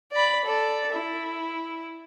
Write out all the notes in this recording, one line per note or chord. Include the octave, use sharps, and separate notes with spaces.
D5 B5
A4 D5
E4